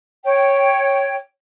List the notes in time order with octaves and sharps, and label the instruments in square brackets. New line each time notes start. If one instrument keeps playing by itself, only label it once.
[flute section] C#5 G5